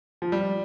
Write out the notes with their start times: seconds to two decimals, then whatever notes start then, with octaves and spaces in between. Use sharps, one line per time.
0.22 F3
0.32 G3